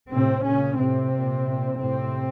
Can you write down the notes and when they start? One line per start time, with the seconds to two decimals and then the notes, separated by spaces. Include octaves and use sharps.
0.12 A2 C3 C4
0.46 A#2 C#3 C#4
0.80 A2 C3 C4
1.13 A#2
1.47 A#2
1.80 A2 C3 C4